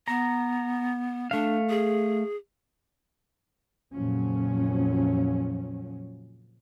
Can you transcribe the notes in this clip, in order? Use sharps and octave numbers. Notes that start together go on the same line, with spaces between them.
B3 A#5
A3 D4 F5
G#4
F2 A#2 C#3 F3 F#3 C#4